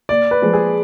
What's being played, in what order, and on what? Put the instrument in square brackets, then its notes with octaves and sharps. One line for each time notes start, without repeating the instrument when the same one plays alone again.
[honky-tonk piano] A#2 [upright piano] D5
[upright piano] B4
[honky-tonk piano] F3 G#3
[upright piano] G#4